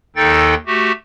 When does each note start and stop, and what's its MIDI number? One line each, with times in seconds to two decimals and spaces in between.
0.16 0.55 39
0.16 0.55 51
0.16 0.55 63
0.16 0.55 69
0.16 0.55 79
0.16 0.55 93
0.67 0.92 57
0.67 0.92 66
0.67 0.92 67